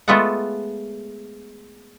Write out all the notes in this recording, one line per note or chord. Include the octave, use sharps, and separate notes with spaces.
G#3 A3 B3 F4 A4 F#5